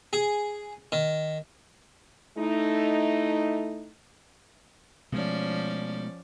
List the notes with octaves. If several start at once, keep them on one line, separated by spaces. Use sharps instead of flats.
G#4
D#3
A3 D#4 E4
B2 F3 G#3 A3 C#4 D5